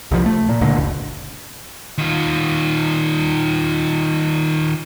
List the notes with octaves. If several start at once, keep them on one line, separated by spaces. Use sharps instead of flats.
C2 F3
A3
A#2
C#2 A#2 D3
F#1
D#3 F4